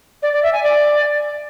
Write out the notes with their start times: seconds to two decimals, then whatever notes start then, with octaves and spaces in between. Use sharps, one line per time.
0.22 D5
0.33 D5
0.43 E5
0.53 G#5
0.63 D5